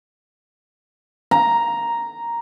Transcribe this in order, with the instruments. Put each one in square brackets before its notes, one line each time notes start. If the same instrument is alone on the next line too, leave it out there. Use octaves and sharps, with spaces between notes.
[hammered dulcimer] A#5